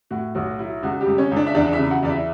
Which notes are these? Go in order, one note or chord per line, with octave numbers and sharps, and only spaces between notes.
A2 F#4
B1 F#4
F#3 E4
C#2 F#4
G3 G4
C#2
C#4 C#5
C#2
D4 D5
E5
E2 D4 D5
E4 E5
C#3
F#4 F#5
E2 D5
E4 E5